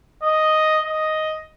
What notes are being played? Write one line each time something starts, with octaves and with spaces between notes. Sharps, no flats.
D#5
D#5